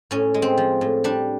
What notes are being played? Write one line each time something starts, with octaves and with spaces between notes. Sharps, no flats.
A2 C#4
G#3
C4
F3
A2
G3 D4